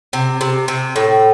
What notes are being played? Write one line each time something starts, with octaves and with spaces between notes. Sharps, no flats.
C3
C3
C3
A2